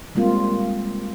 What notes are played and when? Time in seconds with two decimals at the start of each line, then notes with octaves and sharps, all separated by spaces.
0.15 G3 G#3 A#3 C4 F4